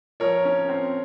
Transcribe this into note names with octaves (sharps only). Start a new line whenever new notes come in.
F3 A#4 C#5
C#4
C4